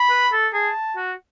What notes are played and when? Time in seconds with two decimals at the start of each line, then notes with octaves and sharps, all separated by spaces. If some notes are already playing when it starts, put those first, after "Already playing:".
Already playing: B5
0.10 B4
0.32 A4
0.53 G#4 A5
0.97 F#4